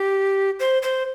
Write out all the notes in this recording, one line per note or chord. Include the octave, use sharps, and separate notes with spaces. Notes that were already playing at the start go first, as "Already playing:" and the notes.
Already playing: G4
C5
C5